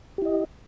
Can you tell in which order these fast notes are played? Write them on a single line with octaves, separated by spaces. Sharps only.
G4 E4 D#5